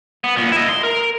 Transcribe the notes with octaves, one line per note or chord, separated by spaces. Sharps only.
B3
A#2 B3
E4 D#5
C6
A#4